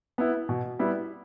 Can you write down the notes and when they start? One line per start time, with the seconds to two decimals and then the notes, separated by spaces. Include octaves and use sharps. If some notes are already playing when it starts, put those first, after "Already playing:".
0.18 B3 E4
0.49 B2
0.79 G3 B3 E4